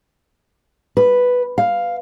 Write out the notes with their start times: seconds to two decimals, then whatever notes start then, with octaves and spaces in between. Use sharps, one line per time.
0.97 B4
1.58 F5